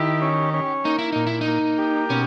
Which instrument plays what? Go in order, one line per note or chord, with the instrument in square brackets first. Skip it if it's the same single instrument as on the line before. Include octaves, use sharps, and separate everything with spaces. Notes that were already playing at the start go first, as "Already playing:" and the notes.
Already playing: [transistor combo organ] D#3 E4 [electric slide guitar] G4
[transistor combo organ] C#4
C#4
[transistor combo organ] A#3 [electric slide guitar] D#4
[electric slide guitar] E4
[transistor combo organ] A#2 [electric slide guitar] D#4
[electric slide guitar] E4
D#4
[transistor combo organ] A#3
G4
[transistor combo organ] B2 [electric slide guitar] C#4